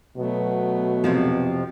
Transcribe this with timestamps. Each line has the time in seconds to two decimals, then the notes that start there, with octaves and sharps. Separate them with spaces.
0.17 B2 F#3 A3 B3
1.04 F2 C3 F3